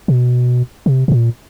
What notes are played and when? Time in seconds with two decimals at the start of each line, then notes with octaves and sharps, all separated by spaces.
0.08 B2
0.86 C3
1.08 A2
1.12 A#2